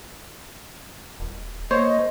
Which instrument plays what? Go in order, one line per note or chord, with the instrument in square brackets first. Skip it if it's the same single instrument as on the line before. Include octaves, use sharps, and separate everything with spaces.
[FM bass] D#1
[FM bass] A#3 [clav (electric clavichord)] C5 C#5 [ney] D#5